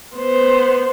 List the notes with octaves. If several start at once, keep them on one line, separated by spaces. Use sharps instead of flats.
B3 C5